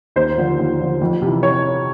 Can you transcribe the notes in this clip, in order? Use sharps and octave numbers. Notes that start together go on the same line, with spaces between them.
D#2 C5
D3 F3
D#2
D3 F3
F2
C3 E3
C#5